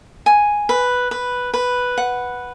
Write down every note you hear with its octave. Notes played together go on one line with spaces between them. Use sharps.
G#5
B4
B4
B4
F#5